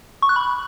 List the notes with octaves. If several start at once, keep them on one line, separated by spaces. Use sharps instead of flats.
C#6
F#6
B5